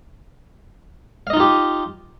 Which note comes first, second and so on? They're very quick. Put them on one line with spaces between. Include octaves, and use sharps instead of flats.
F5 D#5 D#4 F4 G4